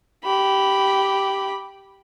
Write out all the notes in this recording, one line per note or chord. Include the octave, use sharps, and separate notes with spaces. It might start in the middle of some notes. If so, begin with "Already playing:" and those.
G4 B5